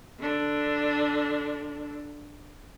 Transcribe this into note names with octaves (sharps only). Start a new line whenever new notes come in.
D3 D4